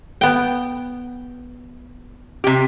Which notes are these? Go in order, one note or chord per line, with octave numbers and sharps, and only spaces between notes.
B3 G5
C3 G4